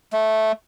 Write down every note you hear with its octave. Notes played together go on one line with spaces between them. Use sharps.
A3